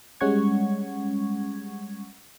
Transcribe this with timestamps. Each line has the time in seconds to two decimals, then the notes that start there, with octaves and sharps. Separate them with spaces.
0.21 G3 G#3 C#4 F#5 C#6 G#6